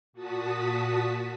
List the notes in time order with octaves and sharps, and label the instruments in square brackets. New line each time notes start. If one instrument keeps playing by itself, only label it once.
[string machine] A#2 F#4 A5 D#6 B6